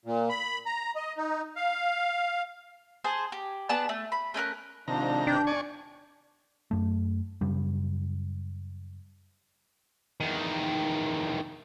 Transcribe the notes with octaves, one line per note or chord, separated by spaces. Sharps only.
A#2
B5
A#5
D#5
D#4
F5
G#4 C5 G#5 A5
G4
B3 D4 G#4 A5
A3
B5
A3 C#4 A#4 F#6
G#2 C3 D#3 F3 D4 A#5
G2 D4 G5 G6
E2 D5 G#5 C#6
F#2 A3
F#2 C#3 G3
E2 D#3